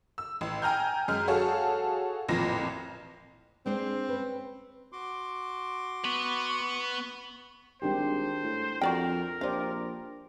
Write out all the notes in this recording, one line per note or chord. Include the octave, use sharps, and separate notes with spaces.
E6
A1
G5 G#5 A#5 F6 G6
F#2 G#3 F6
F#4 G#4 A4 C#5 F5 A5
A1 F2 A#2 A#6
G#3 C4 D4 C5
C#4 B4
F#4 C6 D6
B3 B4 C#6
G#1 G3 D4 G4 C5
A2
F2 F#4 A#4 D5 G5
A#1 G4 C5 D5 D#5 F5